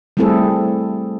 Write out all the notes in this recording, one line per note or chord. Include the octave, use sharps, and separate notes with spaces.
G3 A3 C4 E4 G#4 A4